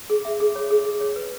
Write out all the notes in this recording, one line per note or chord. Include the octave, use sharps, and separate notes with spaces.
G#4
E5
G#4
C#5
G#4
G#4
C#5
B4